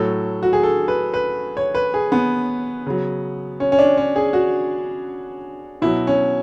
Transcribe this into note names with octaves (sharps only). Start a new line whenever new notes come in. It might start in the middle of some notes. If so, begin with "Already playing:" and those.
Already playing: A2 F#3 A4
F#4
G#4
A4
B4
B4
C#5
B4
G#4
B3
C#3 F#3
C#4
C#4
D4
C#4
G#4
F#4
B2 F#3 E4
C#4